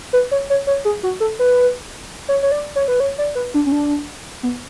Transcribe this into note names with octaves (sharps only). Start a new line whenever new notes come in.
B4
C#5
C#5
C#5
G#4
F#4
A4
B4
C#5
C#5
D5
C#5
B4
C#5
D5
B4
D4
C#4
D4
B3